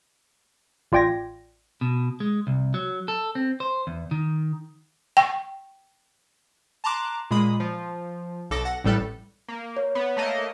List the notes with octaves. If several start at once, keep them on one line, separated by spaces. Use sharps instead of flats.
A1 F4 D5 G5 G#6 A#6
B2
G#3
C2
F#3
A4
C4
C5
E2
D#3
G5
A5 A#5 C6 D6 F#6
A#2 G#3 B5 D#6
F3
B1 A4 D6 A#6
F#5 A#6
A1 A2 G3 A4 F#6
A#3
C#5
B3
A3 A#3 D#5